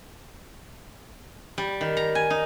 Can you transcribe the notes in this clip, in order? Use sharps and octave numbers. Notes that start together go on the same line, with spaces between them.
G3
D#3
A#5
G#5
D#4